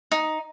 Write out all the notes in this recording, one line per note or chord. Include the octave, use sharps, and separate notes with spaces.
D#4